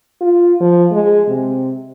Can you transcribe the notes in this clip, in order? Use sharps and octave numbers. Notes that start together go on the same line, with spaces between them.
F4
F3
G#3
C3